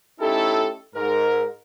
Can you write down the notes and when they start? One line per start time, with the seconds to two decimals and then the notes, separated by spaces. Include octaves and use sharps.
0.21 A3 C#4 D#4 E4 G4 A4
0.95 G#2 A#4